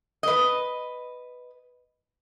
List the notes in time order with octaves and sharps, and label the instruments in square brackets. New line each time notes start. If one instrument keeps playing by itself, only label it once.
[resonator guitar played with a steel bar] B4 D#5